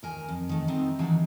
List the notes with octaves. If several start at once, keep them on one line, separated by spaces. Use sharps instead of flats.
D#2 A#4 G#5
F2
D#3 A3
G3 A3 B3 C4 D#4
D#3 E3 F#3 D4 F#4 G4